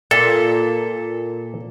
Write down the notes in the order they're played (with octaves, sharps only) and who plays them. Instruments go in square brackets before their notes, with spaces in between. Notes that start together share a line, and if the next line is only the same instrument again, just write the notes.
[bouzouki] A#2 [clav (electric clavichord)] A4